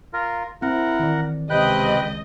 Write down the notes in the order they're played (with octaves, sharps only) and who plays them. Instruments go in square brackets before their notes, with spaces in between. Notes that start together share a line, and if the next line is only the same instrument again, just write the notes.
[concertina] F4 A#4
[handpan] C4 [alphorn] E4 [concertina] A#4 F#5
[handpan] D#3 E3 D5
[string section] C#2 D#5 [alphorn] C3 [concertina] B4 G5 F#6